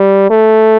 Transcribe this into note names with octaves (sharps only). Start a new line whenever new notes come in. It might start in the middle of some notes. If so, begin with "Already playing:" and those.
Already playing: G3
A3